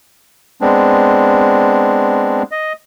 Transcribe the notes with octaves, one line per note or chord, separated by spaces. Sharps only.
G#3 B3 C4 D4
D#5